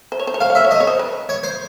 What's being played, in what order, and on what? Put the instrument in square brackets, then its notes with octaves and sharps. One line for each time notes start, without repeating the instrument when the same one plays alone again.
[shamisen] C5
C#5
C5
C#5
[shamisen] C5 [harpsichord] F5
[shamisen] C#5
[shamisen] C5 [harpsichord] E5
[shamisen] C#5
[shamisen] C5 [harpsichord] D#5
[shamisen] C#5
C5
B4
[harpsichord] C#5
C5